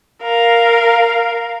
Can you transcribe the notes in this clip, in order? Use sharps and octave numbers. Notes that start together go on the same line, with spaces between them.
A#4 F5